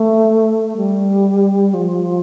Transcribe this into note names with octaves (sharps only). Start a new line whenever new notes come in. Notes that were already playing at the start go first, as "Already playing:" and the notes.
Already playing: A3
G3
F3